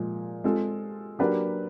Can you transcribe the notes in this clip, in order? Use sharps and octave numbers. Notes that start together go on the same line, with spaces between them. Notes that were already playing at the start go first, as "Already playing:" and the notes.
Already playing: A#2 F3 G#3
G#3 C4 F4 A4
F#3 A#3 D4 G4 B4